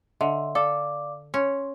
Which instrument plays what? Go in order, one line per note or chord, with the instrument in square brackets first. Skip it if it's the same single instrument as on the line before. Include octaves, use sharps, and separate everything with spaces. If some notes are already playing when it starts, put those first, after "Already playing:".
[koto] D3 [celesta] D#5 E5 C6
[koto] A4 [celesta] D5 F5 D6
[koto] C#4 [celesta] C6